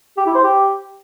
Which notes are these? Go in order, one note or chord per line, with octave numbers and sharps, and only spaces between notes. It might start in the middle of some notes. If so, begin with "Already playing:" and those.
G4
E4
C5
G4